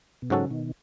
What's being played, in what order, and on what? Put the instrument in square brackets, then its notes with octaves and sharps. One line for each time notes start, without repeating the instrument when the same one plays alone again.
[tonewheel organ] B2
[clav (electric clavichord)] G#2 F#3 C#4 F#4 A4 [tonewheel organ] C#3
[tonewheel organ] B2 D#3